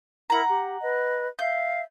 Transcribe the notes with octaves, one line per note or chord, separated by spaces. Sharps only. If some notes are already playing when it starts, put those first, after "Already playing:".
E4 A#4 F#5 A#5
G4
B4 D#5
E5 F5 G6